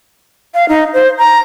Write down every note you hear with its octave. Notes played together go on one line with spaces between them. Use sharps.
F5
D#4
C5
A#5